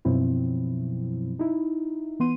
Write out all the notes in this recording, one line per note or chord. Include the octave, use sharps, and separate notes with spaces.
F#2 B2 F3 F#3 C4 E4
D#4 E4
E3 B3 C6 D#7